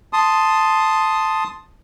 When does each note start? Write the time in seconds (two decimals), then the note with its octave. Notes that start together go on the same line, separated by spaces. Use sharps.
0.13 A5 C6 D#6